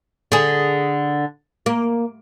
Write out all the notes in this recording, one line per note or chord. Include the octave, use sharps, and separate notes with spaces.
D3 G#4
A#3